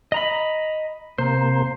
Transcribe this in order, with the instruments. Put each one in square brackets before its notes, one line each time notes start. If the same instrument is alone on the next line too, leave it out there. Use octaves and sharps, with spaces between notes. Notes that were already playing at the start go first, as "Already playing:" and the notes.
[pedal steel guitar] D#5 A#5 B5
[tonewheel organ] C3 A#3 [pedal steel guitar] C5